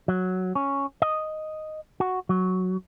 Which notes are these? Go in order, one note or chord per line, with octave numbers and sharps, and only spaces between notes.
F#3
C#4
D#5
F#4
F#3